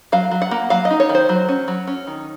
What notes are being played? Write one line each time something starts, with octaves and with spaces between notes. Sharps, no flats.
F#3 F5
F#3
F#5
A#3
F#3 F5
D#5
D#4
C#5
D#3
C5
F#3
C#4
F#3
C#4
D#3